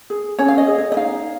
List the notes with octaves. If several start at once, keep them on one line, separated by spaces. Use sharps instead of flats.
G#4
C#4 C#5
F5
D#5
G#4
C#5
D#5
D#4 F5